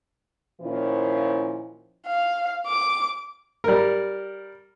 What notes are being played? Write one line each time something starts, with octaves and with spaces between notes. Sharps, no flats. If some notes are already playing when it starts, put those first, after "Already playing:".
A#2 D#3 F3 C#4 E4
F5
D6
G3 A#4